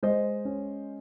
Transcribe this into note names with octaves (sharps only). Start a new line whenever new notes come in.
G#3 C5 D#5
C#4